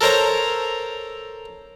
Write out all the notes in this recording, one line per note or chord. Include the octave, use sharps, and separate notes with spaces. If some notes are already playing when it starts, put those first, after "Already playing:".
A4 A#4 C5 C#5 A#5